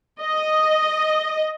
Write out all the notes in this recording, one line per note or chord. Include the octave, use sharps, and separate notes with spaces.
D#5